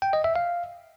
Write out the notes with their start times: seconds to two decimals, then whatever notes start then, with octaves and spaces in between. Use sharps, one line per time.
0.02 G5
0.13 D#5
0.24 E5
0.36 F5